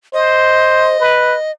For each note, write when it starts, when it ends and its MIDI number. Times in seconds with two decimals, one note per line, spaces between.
0.14 0.95 72
0.14 1.51 75
1.00 1.36 71